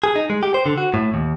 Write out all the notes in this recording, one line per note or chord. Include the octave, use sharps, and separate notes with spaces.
G#4
D#4
G#3
G4
C5
D3
F#4
A2
D#2